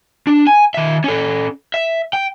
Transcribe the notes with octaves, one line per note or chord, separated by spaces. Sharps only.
D4
G#5
D#3 E5
C#4 A4
E5
G5